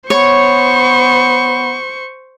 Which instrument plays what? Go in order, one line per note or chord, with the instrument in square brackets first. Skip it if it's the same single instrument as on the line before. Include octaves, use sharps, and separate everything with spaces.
[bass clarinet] B3 [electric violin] C5 C#6 [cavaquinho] C#5